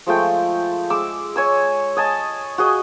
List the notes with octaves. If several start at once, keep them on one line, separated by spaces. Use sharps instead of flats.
F3 G#3 A3 G5
G#3 D6 E6
C#5 G#5 E6
D#5 G#5 A5
F#4 G#4 D#5